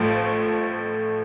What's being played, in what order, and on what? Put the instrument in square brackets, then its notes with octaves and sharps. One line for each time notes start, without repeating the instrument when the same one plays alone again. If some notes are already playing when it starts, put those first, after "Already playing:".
Already playing: [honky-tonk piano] A1 A2 F3 A3